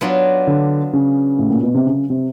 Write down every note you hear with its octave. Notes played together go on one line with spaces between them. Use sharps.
F#3 B3 D4 F4
D3
C#3
A2
A#2
B2
C3
C#3
C3